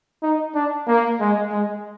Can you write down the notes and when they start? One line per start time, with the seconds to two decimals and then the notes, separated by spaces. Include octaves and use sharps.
0.22 D#4
0.55 D4
0.88 A#3
1.21 G#3
1.52 G#3